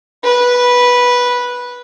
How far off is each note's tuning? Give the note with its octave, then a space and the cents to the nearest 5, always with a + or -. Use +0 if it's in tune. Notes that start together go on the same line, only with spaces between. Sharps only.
B4 -10